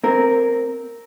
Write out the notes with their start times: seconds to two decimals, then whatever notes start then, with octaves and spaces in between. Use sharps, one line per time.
0.04 C4 A#4